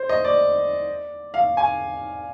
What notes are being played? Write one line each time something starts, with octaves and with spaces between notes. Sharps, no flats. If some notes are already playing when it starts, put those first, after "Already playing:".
Already playing: C5
D#5
D5
F5
G#5